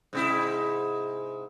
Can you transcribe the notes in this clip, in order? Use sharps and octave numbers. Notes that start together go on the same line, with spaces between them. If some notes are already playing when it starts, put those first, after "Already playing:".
G#2 C3 E4